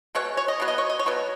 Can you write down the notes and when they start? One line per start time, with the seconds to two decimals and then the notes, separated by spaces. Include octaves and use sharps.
0.15 B2 G#3 C#5
0.37 C#5
0.48 D#5
0.60 B2 F#3 B3
0.68 D#5
0.78 C#5
0.90 D#5
0.99 C#5
1.06 B2 F#3 B3